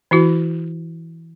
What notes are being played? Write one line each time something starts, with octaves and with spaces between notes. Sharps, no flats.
E3 E4 F#4